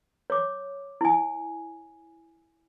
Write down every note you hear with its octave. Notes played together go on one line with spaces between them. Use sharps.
C#5 D6
E4 G#5